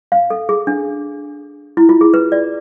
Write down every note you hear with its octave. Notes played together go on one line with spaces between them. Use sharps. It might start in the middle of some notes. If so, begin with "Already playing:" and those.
F5
A4
G#4
D4
E4
F4
G#4
B4
D5